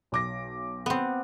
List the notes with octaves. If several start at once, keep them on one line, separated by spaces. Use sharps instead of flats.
B1 D6 A#6
B3 C4